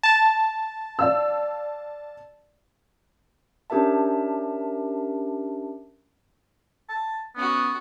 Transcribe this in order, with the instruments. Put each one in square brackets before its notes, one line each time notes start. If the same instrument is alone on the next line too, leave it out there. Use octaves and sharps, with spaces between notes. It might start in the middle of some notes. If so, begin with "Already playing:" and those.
[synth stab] A5
[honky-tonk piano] D5 F5 E6
[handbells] C#4 D4 G4 A#4 E5 A5
[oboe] A5
[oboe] B3 [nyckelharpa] C#4 F#4